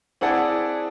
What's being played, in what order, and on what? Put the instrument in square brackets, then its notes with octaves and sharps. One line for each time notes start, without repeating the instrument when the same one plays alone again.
[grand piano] C4 E4 G#4 D5 F#5 A5